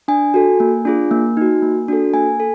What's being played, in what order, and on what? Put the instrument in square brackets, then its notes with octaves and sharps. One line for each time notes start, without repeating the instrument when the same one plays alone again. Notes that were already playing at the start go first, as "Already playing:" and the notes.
[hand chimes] D4 G#5
F#4 A4
A#3
D4 F4 G#4
A#3
D#4 F#4
A#3
D4 F#4 A4
A#3 G#5
A4